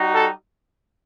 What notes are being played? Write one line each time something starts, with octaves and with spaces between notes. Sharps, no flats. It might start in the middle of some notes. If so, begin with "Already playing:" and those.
Already playing: G3 D#4 F#4
A4